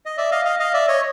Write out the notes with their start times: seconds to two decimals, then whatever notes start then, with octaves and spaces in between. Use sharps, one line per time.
0.06 D#5
0.17 D5 E5
0.31 D#5 F5
0.45 D#5 F5
0.60 D#5 F5
0.74 D5 E5
0.87 C#5 D#5